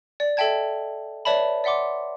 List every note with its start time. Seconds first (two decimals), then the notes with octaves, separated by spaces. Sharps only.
0.20 D5
0.37 A4 D#5 E5 G5 A5 G#6
1.25 B4 C#5 D5 E5 A5 B5
1.64 D5 E5 F#5 C6 D6